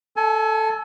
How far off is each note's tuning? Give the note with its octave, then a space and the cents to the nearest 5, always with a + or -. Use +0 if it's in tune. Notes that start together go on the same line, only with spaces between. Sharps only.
A4 +0 G#5 +35